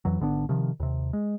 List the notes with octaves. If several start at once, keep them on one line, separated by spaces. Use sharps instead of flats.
F2 E3 F#3
G#1 D3 B3 D4
C3 D#3 F3
D#2 C3
G#3